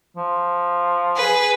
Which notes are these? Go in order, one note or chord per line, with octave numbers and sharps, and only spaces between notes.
F3
G#4 B4